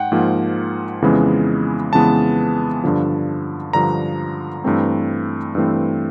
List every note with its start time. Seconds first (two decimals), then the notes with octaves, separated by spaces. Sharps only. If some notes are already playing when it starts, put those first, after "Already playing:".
Already playing: G#2 F#5 G5
0.12 G#2 F3 A#3
1.02 F2 C#3 E3 G#3 B3
1.93 F2 C#3 E3 G#3 B3 A5
2.84 G2 D3 F3
3.73 G2 D3 F3 A#5
4.64 G2 E3 A3 C4
5.55 G2 E3 A3 C4